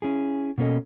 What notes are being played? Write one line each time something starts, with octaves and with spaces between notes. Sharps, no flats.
C#4 E4 G#4
B2 A#3 C#4 A4 D#5